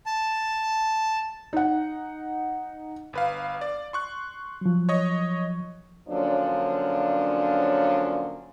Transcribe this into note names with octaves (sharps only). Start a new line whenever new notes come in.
A5
D#4 F#5
G1 B4 F5
D5
C6 C#6 F#6
F3 F#3
C#5 D#5 C#6
D3 F3 F#3 A#3 C#4 D4